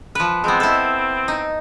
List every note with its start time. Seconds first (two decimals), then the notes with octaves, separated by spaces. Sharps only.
0.15 F3 B4
0.44 G#3 B3 C4
0.60 E4 A4
1.28 D#4